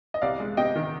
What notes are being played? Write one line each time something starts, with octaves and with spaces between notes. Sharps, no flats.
D#5
C2 D5 F5
G#3
C3 D#5 G5
D#3